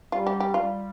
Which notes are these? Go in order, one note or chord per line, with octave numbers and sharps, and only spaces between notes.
G3 F4
G4
G4
G3 F4